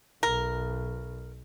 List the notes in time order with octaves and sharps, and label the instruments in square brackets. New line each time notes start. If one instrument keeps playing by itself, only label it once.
[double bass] B1 [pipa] A#4